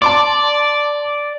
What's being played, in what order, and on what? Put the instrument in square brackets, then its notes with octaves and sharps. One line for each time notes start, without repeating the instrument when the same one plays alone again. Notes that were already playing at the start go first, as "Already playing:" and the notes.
[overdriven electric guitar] D5 [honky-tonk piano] A5 C6 D6